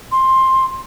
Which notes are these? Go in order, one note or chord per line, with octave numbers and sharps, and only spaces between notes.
C6